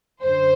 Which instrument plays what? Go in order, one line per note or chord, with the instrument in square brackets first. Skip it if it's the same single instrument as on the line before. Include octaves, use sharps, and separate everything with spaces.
[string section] F#2 D3 C5